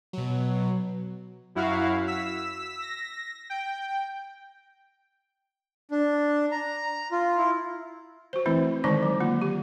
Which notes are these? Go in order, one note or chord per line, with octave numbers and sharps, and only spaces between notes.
B2 F#3
F#2 E4 F#4 F5
E6 B6
A#6
G5
D4
A#5
F4
E4
F#4 C5
E3 A3 C4 E4
D3 D#3 G#3 D#4 C5 C#6
F#3
A#3 F4
G4